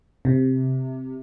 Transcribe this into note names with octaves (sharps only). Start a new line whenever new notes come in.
C3